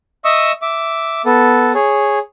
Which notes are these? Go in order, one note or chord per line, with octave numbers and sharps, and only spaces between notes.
D#5 E5 C#6 D#6 E6
E5 D6
B3 A4
G#4 C#5